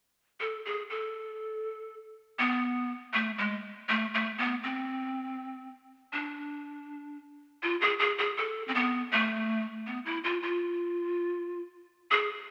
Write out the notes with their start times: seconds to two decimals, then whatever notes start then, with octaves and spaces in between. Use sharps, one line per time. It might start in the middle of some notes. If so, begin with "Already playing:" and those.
0.40 A4
0.65 G#4
0.90 A4
2.39 B3
3.13 A3
3.38 G#3
3.89 A3
4.14 A3
4.38 B3
4.63 C4
6.13 D4
7.63 F4
7.81 G#4
7.99 G#4
8.18 G#4
8.37 A4
8.68 C4
8.75 B3
9.13 A3
9.87 B3
10.06 E4
10.24 F4
10.43 F4
12.11 G#4